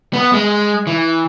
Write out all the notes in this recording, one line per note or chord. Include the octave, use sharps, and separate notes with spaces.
B3
G#3
E3